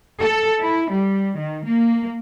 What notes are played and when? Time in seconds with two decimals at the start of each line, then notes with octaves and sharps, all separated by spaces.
0.19 A4
0.60 E4
0.91 G3
1.36 D#3
1.65 A#3